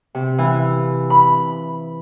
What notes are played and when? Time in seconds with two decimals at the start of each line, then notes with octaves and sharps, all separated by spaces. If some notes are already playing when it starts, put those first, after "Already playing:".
0.15 C3
0.38 E3
1.10 B5